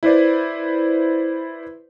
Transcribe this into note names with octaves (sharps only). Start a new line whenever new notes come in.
E4 B4 C5 D5